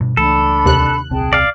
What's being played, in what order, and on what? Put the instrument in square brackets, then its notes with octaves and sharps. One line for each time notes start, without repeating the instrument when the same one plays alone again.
[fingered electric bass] G2 B2
[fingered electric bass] C#2 E3 A3 [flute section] D4 B5 [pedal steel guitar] A4
[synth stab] D#2 C3 F#6
[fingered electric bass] D#1 C2 C4 [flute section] G#4 G5 A5
[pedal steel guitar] D5 F5